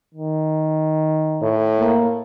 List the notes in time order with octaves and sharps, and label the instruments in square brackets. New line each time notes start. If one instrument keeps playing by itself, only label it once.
[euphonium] D#3
[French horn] A2
[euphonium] A#3